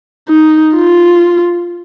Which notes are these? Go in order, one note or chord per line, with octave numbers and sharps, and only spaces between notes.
D#4
F4